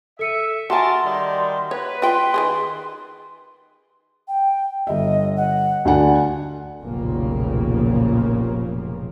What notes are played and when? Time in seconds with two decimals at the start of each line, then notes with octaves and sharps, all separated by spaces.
0.19 A4 E5 C#7 D#7
0.70 F#4 A#4 E5 F#5 G#5 A5 C6
1.04 D#3 G3
1.71 B4 C#5
2.02 F4 G5 C6
2.34 D#3 G3 G#4
4.28 G5
4.87 G1 D#5 E5
5.37 F#5
5.85 D2 D4 F#5 G#5
6.82 F1 B1 A#2 C#3 F3 A#3